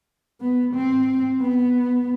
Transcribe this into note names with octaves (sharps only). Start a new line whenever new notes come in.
B3
C4
B3